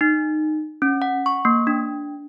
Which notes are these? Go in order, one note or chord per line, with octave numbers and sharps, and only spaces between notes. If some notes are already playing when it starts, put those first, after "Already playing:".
D#4
C#4
F#5
C#6
A#3
D4